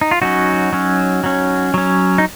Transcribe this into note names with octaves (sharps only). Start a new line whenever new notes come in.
D#4
F4
F#3 C#4 D#4 F#4
F#3 C#4
F#3 C#4
F#3 C#4
D#4